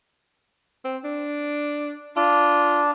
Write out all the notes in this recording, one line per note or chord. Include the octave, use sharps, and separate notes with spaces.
C4
D4
D4 F4